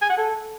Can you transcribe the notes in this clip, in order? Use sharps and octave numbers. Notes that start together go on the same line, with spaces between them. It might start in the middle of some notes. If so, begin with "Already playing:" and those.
G#5
F#5
A4